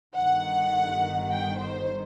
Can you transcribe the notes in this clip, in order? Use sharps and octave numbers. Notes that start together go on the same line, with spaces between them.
G1 G2 D#3 F#5
G5
C5